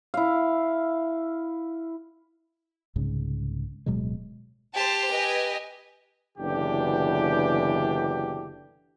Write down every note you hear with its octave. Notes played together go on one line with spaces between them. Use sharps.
E4 F5
C2 G#2 C#3
D1 B2 F#3 G#3
G4 C5 A5
B4 D#5 G#5
F#1 B2 D3 E3 D4 G4